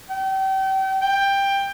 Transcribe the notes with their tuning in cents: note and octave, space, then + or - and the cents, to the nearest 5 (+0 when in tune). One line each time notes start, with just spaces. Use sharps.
G5 -35
G5 +15